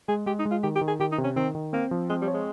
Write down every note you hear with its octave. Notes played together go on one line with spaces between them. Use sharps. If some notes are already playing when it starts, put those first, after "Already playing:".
G#3 G#4
G#3 G4
D#4
G#3
F4
D#3 G4
G4
D#3
G#4
D#3 G4
D#4
C3
C#4
D#3 C4
D#3
A#3 C4
F3
G#3 C4
G3
C#5
G#3